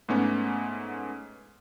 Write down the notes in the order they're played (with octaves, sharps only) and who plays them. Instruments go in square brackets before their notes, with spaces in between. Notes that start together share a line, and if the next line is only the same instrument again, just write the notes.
[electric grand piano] G#2 A3 B3 C#4